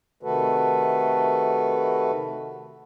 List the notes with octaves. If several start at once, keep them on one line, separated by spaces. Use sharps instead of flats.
C3 D#3 A3 F#4 A4 B4